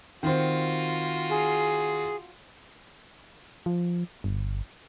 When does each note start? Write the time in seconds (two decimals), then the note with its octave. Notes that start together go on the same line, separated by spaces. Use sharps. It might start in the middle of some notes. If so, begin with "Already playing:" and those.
0.23 D#3 C4 F4 F#4
1.29 G#4
3.66 F3
4.24 G1